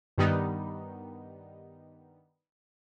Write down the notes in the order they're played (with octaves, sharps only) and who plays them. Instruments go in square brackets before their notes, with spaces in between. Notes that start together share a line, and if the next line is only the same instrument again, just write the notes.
[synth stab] G2 D#3 G3 B3 D#4